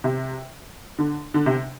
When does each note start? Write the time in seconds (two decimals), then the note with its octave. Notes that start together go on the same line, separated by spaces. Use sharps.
0.04 C3
0.99 D3
1.34 D3
1.46 C3